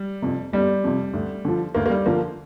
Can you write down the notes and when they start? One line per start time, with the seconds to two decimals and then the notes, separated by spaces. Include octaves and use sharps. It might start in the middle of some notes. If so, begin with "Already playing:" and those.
Already playing: G3
0.22 F2 C3
0.53 G1 G3
0.84 F2 C3
1.13 D2
1.45 D3 F3
1.75 D2 A#3
1.86 A#3
1.90 G3
2.06 D3 F3 A#3